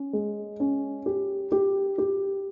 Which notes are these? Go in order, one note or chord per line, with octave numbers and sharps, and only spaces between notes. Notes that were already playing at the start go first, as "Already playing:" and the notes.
Already playing: C#4
G#3
C#4
G4
G4
G4